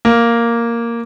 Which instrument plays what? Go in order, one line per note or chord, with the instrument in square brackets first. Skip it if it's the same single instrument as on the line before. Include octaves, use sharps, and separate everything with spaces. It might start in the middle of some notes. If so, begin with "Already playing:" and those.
[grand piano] A#3